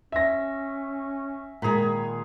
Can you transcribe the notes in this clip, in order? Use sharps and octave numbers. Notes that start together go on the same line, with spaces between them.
C#4 E5 A#6
A#2 D#3 G#3 G#4 A#5 B5